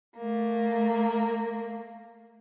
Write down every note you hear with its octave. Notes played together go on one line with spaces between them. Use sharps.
A3 A#3